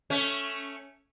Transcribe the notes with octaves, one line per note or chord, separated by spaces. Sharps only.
A3 C#4